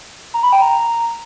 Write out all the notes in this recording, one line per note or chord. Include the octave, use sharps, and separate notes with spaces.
A#5
B5
G5
A#5